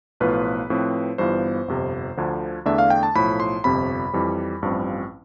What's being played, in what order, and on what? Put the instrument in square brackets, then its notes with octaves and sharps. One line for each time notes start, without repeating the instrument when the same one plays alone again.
[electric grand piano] B1 A2 F3 B3 F4 B4
A2 F3 C4
G1 G2 E3 B3 F4 C5
G1 F2 C3
D2 D3 F3
E2 D3 A3 D4 E5
F5
G5
A5
B1 A2 F3 B5
C6
G1 F2 C3 B5
F2 E3 G3
A1 G2 F3 C4